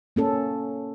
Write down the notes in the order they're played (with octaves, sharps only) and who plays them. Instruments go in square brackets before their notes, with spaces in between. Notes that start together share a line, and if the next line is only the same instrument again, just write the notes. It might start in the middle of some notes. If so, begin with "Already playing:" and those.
[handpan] A#3 C#4 A4